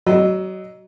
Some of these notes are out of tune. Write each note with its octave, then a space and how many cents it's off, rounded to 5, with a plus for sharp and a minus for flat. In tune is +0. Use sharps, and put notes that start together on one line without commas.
F#3 +25 D#5 -10